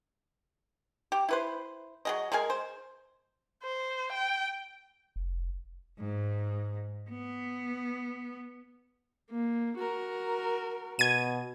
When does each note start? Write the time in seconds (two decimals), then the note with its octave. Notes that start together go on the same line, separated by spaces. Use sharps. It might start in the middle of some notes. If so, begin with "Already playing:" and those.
1.12 G4
1.29 E4 B4 C5
2.05 F#3 G#4 D#5
2.32 G#3 G#4 A#4 G#5
2.50 C5
3.63 C5
4.13 G5
5.16 F1
5.99 G#2
7.10 B3
9.31 A#3
9.79 F#4 A#4
10.99 B2 G#6 D#7